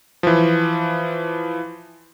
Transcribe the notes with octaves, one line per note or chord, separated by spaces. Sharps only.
E3 F3